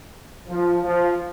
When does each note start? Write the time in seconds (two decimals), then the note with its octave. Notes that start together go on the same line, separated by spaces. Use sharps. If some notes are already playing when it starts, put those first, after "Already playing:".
0.48 F3
0.83 F3